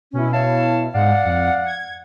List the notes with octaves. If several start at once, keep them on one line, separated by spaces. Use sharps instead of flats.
B2 C#4 E4
C#5 F5 A5
G#2 G#3 D5 F5 F#5
F2
G#6